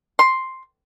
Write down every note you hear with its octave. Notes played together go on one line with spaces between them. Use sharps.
C6